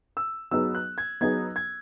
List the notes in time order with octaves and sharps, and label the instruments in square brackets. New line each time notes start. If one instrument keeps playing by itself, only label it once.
[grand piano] E6
[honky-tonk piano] F#3 B3 D#4 G#4 [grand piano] E6
[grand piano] F#6
G#6
[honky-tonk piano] F#3 B3 D#4 G#4 [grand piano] G#6
[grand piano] G#6